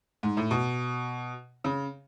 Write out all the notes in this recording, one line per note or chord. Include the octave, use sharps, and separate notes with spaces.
G#2
A2
B2
C#3